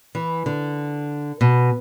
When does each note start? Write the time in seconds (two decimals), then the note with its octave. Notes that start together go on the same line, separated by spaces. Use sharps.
0.15 E3
0.46 D3
1.41 B2